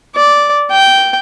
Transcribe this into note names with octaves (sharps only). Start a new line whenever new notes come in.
D5
G5